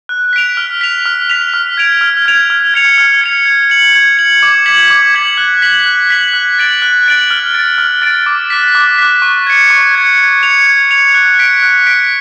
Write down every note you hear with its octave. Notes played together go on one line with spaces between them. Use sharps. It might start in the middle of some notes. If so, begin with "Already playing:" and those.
F#6
B6 D7 F7
F6
B6 F7
F6
B6 F7
F6
G#6 D7 F7
F6
G#6 D7 F7
F6
G#6 C#7 F7
F6
G#6 C#7 F7
G#6
C#7 F#7
G#6
C#7 F#7
D6
G#6 B6 F#7
D6
G#6 B6 F#7
F#6
B6 F#7
F#6
B6 F#7
F#6
A6 D7 F#7
F#6
A6 D7 F#7
F6
A6 D7
F6
A6 D7
D6
F#6 B6
D6
F#6 B6
C#6
G#6 C#7
C#6
G#6 C#7
G#6
C#7 F7
G#6
C#7 F7
F#6
B6 D7
F#6
B6 D7